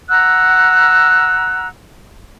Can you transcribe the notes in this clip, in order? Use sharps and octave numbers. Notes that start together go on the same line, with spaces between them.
F#5 A#5 E6 F#6